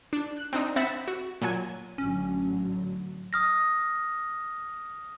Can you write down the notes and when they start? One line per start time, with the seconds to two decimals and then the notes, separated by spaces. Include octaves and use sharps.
0.13 D4
0.37 F#6
0.53 C4 D4 D#4
0.76 C4 E5 F#5 B5 A6 E7
1.08 F#4
1.41 A#2 F#3 G#5
1.98 A1 D3 F#3 C#4
3.33 D#6 F6 A#6